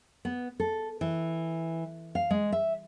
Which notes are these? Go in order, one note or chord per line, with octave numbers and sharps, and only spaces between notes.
B3
A4
E3
F5
G#3
E5